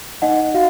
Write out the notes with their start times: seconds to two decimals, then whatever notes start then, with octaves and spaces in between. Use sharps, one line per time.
0.22 D#4 D#5 F#5
0.54 F#4 F5